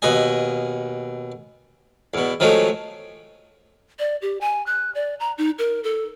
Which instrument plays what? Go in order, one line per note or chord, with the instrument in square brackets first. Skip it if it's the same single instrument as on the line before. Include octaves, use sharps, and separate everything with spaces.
[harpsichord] D#2 B2 B4 D#5 G#5
E2 B2
D#3 F3 F#3 G#3 A3
[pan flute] D5
G4
G#5
F#6
D5
A#5
D#4
A#4
A4